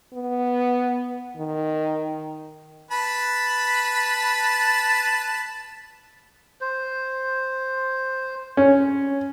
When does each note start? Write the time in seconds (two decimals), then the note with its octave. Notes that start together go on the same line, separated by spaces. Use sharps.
0.14 B3
1.36 D#3
2.91 B4 A5 B5
6.61 C5
8.57 C#4